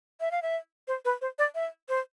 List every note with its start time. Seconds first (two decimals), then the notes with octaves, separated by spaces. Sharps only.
0.21 E5
0.31 F5
0.42 E5
0.88 C5
1.05 B4
1.21 C5
1.39 D5
1.55 E5
1.89 C5